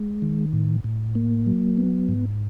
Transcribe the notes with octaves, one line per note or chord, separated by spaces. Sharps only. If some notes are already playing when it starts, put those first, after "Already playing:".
Already playing: G#3
D#3
A2
A2
A#3
F#3
B3
G#2